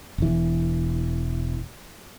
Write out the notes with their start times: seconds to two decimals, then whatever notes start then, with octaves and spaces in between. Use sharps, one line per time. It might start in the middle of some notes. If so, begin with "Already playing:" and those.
0.18 E1 E3